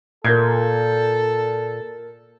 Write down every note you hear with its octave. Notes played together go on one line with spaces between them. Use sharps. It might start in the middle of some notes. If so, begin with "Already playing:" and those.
A#2 A4 A#4 G6 G#6